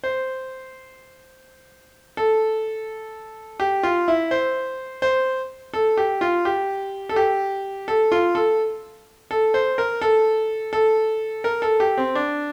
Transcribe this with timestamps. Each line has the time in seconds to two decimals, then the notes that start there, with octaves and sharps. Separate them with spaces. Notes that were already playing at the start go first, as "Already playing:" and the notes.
0.04 C5
2.17 A4
3.60 G4
3.83 F4
4.08 E4
4.31 C5
5.02 C5
5.74 A4
5.97 G4
6.21 F4
6.45 G4
7.09 A4
7.16 G4
7.88 A4
8.12 F4
8.35 A4
9.31 A4
9.54 C5
9.78 A#4
10.02 A4
10.73 A4
11.44 A#4
11.62 A4
11.80 G4
11.98 C4
12.15 D4